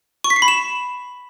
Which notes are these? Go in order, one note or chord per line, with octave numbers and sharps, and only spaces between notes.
C#6
B6
C7
B5
E7